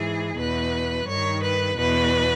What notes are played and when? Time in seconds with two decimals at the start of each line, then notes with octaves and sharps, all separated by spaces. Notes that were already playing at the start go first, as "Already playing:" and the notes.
Already playing: G#2 E3 G#4
0.36 E2 B2 B4
1.06 G2 D#3 C#5
1.41 B4
1.77 E2 B2 B4